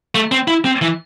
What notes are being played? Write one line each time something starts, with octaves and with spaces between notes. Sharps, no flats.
A3
C4
E4
C4
E3